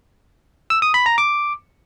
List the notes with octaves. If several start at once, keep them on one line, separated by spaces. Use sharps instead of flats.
E6
D#6
B5
A#5
D6